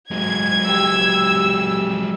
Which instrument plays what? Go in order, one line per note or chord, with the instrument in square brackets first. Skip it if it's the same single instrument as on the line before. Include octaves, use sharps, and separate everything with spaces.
[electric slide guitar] G#2 [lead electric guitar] F#3 G#3 [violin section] G#6
[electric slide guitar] F2 G4 [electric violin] E6